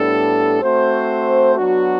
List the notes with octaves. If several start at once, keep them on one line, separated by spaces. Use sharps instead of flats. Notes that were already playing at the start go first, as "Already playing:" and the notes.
Already playing: A2 G3 B3 D4 A4
A3 C4 F#4 C5
F#3 B3 D4 F#4